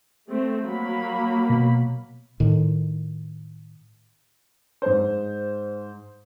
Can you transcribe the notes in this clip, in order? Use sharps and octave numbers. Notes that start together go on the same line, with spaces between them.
A3 C4
F#3 A#3 B5
B2
A2 D#3
G#2 C5